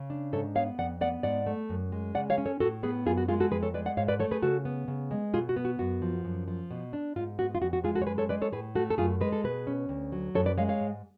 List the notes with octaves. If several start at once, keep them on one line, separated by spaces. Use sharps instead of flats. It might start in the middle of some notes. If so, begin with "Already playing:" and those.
Already playing: C#3
D4
G#2 A4 C#5
B3 C#5 F5
F2 D5 F#5
B3 D5 F#5
G#2 D5 F#5
A3
F#2
G#3
C#3 D5 F#5
C#5 F5
C#4
A4 C#5
A2 F#4 A4
B3 G#4 B4
F#2 F4 G#4
F#4
G#3 F4 G#4
F#4 A4
F2 G#4 B4
A4 C#5
G#3 B4 D5
D5 F#5
G#2 C#5 F5
B4 D5
A3 A4 C#5
G#4 B4
C#3 F#4 A4
B3
C#3
G#3
B2 F4 G#4
F#4
B3
F#4
F#2 F#4
F3
F#2
F3
B2
D4
G#2 F4
B3 F#4
F4
F2 F#4
F#4
G#3 F4 G#4
F#4 A4
C#5
F#2 G#4 B4
A4 C#5
G#3 B4 D5
A4 C#5
A2 G#4 B4
A3 F#4 A4
A4
F#2 F4 G#4
G#3 B4
A4
B2 G#4 B4
C#4
D2
F#3
F#2 A4 C#5
B4 D5
G#3 C#5 F5
C#5 F5
G#2